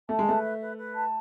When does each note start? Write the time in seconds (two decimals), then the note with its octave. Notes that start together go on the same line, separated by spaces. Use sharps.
0.09 A3 A5
0.19 G#3
0.26 A3 B4
0.43 E5
0.61 B4
0.77 B4
0.95 A5